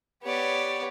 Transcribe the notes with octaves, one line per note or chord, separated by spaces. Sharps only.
B3 G4 C#5 D5